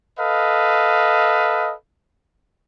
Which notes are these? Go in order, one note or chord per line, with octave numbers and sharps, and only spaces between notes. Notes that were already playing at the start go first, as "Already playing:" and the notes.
A4 B4 D#5 F5